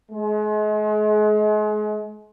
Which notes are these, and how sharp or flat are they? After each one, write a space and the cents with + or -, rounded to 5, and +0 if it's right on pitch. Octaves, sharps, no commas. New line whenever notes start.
G#3 +35